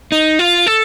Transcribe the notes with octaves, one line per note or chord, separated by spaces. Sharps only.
D#4
F4
A4